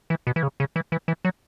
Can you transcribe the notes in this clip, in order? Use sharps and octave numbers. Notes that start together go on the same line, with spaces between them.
E3
B2
E3
C#3
C#3
E3
E3
E3
F#3